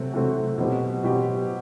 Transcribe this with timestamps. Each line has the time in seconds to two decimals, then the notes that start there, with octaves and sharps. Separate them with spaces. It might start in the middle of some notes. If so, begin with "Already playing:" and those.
Already playing: C3 F#3 A3 C4 F#4
0.13 C3 F#3 A3 C4 F#4
0.58 B2 F#3 C4 G4
1.04 B2 F#3 C4 G4